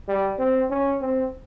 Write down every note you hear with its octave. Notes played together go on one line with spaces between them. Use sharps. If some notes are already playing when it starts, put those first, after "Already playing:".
G3
C4
C#4
C4